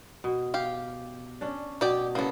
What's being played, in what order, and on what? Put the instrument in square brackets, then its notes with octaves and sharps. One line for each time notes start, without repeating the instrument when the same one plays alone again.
[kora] B2
[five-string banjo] G4 F5
[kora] C#4 D4
[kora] B2 [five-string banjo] G4 D5 G5
[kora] C#3 E4 A4 [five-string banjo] A#3 B3